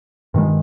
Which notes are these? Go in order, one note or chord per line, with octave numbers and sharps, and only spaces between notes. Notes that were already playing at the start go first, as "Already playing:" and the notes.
G2 D#3 G#3